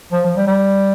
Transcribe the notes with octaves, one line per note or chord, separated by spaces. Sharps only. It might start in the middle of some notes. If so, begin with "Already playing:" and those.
F3
F3
G3
G3